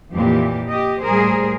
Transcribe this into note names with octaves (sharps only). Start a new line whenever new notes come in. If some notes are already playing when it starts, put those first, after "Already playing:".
F2 A#2 E3 G4
G4 D#5
A2 G3 A3 G#4 A#4 C5